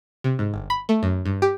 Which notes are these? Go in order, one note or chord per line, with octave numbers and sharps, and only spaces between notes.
C3
G#2
G1
B5
A3
F#2
G2
G4